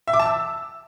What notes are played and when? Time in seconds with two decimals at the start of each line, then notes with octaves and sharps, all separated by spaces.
0.08 E5
0.13 D6
0.19 A5
0.25 E6